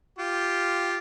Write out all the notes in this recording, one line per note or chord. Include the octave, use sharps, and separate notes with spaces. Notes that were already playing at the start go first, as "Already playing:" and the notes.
F4 G4